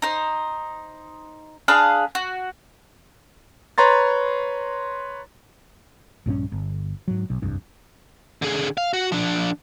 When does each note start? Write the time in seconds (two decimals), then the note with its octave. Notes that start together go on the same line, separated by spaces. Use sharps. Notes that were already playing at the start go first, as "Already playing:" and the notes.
0.02 D#4 C5
1.68 D4 G#4 F5 B5
2.15 F#4
3.78 B4 C#5 A#5 C6 A6
6.26 A#1 G2 F3 C#4
6.52 G1
7.08 G#2 F#3
7.30 B1
7.42 F1 C2 G2
8.42 D3 G#4
8.77 F5
8.93 F#4
9.12 F3 D4